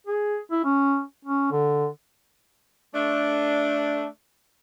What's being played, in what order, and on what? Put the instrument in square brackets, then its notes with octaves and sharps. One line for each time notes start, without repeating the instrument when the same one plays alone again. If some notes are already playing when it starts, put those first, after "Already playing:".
[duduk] G#4
E4
C#4
C#4
D3
[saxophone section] A3 D4